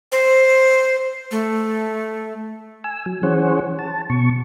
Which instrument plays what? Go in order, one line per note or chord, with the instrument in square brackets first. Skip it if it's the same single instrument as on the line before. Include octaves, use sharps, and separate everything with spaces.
[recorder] C5
A3
[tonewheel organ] G#5 E6
F#3
E3 C#4 G#4 C5 C#5 F#5
A5
B2 C#6